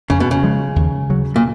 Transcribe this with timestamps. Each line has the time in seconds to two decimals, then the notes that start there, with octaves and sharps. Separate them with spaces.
0.10 F2 C#3
0.20 B2
0.31 C#3
0.43 F3 G#3
0.76 D#2
1.10 C#3 F#3
1.36 A#2